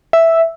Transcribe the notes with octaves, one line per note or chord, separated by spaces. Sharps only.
E5